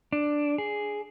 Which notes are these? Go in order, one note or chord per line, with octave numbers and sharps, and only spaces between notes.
D4
G#4